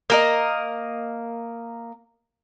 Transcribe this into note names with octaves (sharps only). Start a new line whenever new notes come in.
A#3 A#4 D#5